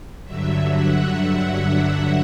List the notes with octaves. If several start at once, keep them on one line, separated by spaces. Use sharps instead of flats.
G2 D3 F#3 E5
F#5